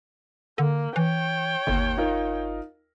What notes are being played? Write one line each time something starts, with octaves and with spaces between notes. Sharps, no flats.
D3 A#3
E3 C#5 G5
G1 D#2
D#4 F4 A#4